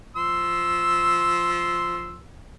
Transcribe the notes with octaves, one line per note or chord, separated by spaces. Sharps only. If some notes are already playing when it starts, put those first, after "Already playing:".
F3 C6 E6